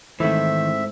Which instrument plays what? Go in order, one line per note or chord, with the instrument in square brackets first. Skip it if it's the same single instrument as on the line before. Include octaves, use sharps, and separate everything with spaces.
[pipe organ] G#2 C4 [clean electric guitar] D#3 E3 [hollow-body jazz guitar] A3 E4 [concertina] E5